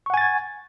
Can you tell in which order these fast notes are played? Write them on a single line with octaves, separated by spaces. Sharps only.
C#6 F#5 G#5 A6 G#6